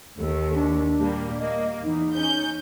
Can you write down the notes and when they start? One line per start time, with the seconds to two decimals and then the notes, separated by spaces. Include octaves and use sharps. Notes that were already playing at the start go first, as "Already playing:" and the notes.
0.19 D#2 A4
0.54 D4
0.98 A#2 G3 A#3
1.39 A#3 D#5
1.83 E2 D#4
2.15 C#4 G6